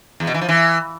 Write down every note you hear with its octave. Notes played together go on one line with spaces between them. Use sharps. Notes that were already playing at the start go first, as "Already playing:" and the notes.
E2
B2
E3
F3
E3